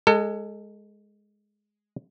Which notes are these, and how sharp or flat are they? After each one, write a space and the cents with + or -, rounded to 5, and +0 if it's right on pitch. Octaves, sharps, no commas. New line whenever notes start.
G#3 +0 A4 +30